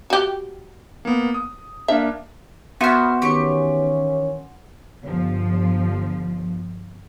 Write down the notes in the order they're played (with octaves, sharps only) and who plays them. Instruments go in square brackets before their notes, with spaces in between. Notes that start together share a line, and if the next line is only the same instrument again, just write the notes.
[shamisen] F#4 G4
[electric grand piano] A#3 B3
D#6
[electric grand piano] A#3 D4 F5 [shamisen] E5
[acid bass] B3 [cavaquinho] F#4 C5 [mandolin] E5 F6
[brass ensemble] D#3 E3 C#4 [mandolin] G4 C#6
[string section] G1 F3